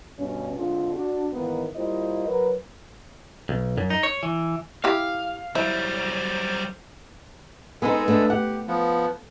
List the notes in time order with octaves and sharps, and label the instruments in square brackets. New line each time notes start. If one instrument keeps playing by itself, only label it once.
[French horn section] G2 B2 C#4
D3 G#3 C4 D4 F4
D4 F#4
D#2 G#2 D#3 E3 A#3 B3
G3 A#3 E4 F4 C5 D#5
F#3 A#4 B4
[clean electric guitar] B1
F#2
D#4
C#5
E3
[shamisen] E4 G4 [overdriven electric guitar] F5
[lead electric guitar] F#3 G3 [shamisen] E4 [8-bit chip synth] C5
[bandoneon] G#3 G#4 A4 [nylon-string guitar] B3 C4 D#4
[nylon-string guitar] A3 B3 D4
[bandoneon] G4 [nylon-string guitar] F#5
[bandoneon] F3 B3